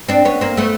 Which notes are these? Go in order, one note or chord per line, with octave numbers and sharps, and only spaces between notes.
C4 D4
B3 C#4
A#3 C4
A3 B3